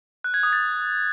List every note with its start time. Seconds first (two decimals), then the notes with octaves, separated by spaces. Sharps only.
0.24 F#6
0.34 G#6
0.43 D#6
0.53 A6